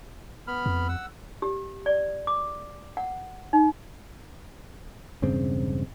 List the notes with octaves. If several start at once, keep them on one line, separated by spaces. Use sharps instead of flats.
B3 B5 F6
F2
F#5 E6
G4
D5
D6
F#5
D#4
E1 G2 C#3 C4